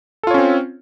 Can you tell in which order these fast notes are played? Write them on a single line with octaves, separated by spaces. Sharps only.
A4 F4 C#5 C#4 C4